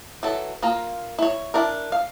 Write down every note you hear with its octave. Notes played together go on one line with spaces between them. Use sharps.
E3 F#3 A4
A#3 F4 A#5
E4 C#5
D4 E4 A#4
F5